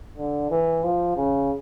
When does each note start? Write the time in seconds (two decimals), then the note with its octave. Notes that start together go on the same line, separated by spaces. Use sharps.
0.17 D3
0.51 E3
0.84 F3
1.16 C#3